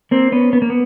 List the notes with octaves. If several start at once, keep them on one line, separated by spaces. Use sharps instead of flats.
A#3 C4
B3 C#4
B3
A#3
B3